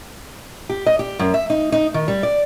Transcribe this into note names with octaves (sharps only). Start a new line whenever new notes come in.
G4
D#5
G4
F#2
E5
D#4
D#4
D#3
G3
D5